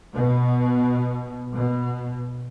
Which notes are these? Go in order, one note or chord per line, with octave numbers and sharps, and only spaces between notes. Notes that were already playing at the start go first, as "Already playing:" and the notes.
B2
B2